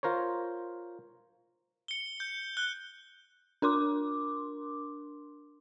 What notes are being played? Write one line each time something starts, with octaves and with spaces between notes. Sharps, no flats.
F4 A#4 C5 C#5
C#7 G7
G6
F#6 G7
D4 A#4 C6 D6